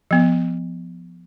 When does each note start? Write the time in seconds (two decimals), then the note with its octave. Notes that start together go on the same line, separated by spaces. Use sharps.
0.11 F3 B3